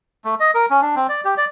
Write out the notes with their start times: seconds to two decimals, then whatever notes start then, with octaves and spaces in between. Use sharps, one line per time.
0.25 A3
0.40 D#5
0.55 A#4
0.70 C#4
0.82 D4
0.96 C4
1.09 D5
1.25 G4
1.38 D5